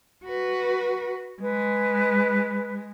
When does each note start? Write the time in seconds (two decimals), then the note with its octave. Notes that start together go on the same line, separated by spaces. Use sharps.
0.25 F#4 B4
1.42 G#3 B4